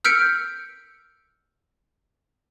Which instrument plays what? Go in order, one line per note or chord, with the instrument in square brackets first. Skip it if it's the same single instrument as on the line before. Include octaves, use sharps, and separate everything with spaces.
[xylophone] E6 F6 G6 B6 C#7 D7